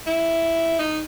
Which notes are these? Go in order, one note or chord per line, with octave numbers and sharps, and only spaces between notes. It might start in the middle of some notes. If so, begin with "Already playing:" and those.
E4
D#4